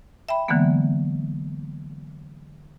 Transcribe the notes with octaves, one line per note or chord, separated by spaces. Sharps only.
E5 G5 B5
D3 E3 F#3 G#3 A#3 B3